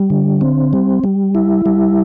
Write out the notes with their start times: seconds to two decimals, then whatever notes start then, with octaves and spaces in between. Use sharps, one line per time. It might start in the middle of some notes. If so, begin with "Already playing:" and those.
Already playing: G3
0.10 D3
0.41 C4
0.73 G3
1.04 G3
1.35 E4
1.66 G3